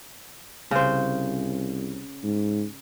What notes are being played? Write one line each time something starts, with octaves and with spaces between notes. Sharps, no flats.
C2 C#3 C5
G#2